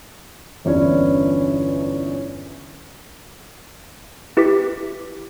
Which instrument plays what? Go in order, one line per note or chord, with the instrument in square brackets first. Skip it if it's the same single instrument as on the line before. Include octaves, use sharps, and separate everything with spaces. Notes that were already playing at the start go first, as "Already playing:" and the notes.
[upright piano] G1 E2 C#4 D4 E4
[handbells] E4 G4 B4 D6 B6